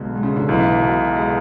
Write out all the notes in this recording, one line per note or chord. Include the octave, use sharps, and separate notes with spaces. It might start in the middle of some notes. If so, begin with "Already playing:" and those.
Already playing: B1 B2 D3 G#3
G#3
C#3
D3
B1 E3
B2
G#3